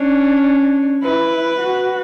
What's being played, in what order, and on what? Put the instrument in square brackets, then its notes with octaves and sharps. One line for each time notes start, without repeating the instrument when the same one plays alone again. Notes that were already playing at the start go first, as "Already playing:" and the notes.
Already playing: [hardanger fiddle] C#4 [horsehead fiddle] D4
[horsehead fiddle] E4 [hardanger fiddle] B4
[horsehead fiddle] F#4